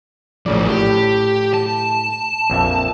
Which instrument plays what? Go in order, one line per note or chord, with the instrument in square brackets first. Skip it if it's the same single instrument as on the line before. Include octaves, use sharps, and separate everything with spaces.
[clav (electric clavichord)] A#1 C#3 D5 [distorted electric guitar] A2 F3
[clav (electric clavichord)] A2 [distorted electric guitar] G4
[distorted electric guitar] A5
[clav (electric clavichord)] A#1 F2 E5